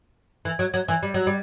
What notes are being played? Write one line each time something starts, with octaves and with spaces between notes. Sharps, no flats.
E3
F#3
F#3
E3
G3
F#3
G3